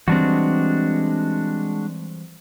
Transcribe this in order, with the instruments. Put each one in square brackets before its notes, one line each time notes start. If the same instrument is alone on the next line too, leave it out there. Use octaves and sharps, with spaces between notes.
[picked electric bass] E3 G3 C4 [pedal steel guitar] G#3 D4 F#4